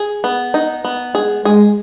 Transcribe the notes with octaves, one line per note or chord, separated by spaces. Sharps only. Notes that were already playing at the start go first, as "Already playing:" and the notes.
Already playing: G#4
B3
D#4
B3
G#3 G#4
G#3 G#4